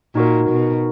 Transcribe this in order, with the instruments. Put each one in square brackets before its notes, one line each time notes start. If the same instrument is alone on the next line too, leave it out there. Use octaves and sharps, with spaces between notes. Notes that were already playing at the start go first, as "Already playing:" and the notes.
[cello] A#2 [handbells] D#4 F#4 A#4
[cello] B2